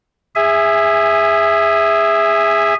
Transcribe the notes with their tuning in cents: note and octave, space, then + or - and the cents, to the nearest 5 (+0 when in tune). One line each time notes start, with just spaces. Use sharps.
G#4 -20 E5 +0 G#5 +0